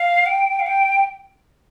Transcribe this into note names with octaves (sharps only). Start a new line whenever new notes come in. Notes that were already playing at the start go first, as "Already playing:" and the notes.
Already playing: F5
G5
F5
G5